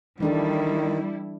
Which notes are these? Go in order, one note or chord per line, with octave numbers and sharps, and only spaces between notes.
D#3 E3 G3 D4 E4 A4